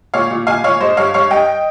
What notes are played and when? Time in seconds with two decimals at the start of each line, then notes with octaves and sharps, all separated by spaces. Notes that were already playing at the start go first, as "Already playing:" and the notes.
0.14 A#2 C#5 F5
0.31 A#2
0.47 A#2 F5 G#5
0.64 A#2 C#5 F5
0.80 G2 C5 D#5
0.97 G2 C#5 F5
1.14 G2 C#5 F5
1.30 G2 D#5 G5